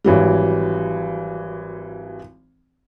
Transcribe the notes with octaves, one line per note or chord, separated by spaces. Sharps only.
G#1 E3 F#3 G3